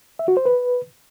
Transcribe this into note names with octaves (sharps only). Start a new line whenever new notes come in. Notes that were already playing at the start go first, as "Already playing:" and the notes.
E5
F#4
C5
B4